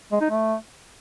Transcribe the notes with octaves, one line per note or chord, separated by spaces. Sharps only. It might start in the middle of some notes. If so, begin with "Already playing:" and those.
G#3
D#4
A3